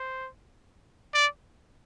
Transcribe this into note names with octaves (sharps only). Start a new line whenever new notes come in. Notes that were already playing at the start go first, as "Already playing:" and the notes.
Already playing: C5
D5